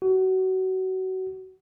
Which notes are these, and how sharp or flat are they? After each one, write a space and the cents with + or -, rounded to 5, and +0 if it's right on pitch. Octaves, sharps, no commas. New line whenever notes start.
F#4 +25